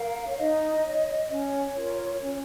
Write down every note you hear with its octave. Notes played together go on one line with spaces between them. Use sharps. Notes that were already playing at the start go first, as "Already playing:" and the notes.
Already playing: A#4 F5
C#5
D#4 D#5
C#5
C#4 C#5
F4 A#4
C#4